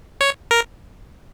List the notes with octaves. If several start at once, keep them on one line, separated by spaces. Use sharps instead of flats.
C#5
A#4